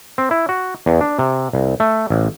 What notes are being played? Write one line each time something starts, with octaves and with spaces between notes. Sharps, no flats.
C4
E4
F#4
E2
D4
C3
C2
A3
A1